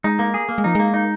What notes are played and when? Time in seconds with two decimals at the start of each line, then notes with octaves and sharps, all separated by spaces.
0.04 G#3 D#4
0.19 A#3
0.34 G#4
0.49 A#3
0.58 G#3
0.64 F3 D#4
0.75 G#3 A#3
0.94 D#4